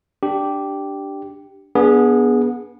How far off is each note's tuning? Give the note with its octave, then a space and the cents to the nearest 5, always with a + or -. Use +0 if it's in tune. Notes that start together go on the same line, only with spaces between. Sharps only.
D4 +0 G4 -5
B3 -25 D4 -20 G#4 +0